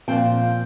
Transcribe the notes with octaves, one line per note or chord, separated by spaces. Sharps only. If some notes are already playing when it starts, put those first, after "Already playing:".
A#2 F3 C4 G5